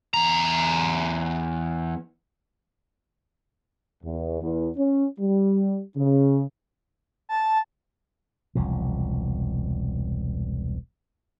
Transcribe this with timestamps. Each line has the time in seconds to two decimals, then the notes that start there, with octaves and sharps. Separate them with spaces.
0.14 E2 A#5
4.04 E2
4.41 E2
4.76 C#4
5.19 G3
5.96 C#3
7.29 A5
8.55 E1 C2 F3